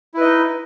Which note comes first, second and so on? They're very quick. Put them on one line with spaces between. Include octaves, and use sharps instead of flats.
E4 B4 D#5 D#4